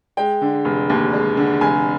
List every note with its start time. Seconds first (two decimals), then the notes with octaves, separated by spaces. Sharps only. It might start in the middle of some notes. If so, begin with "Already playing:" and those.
0.17 G#3 G5
0.41 D3
0.65 F1
0.90 D#2
1.13 G#3
1.37 D3
1.61 F1 G#5